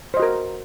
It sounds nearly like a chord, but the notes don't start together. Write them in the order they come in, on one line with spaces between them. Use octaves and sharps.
C5 D#5 F#4 A#4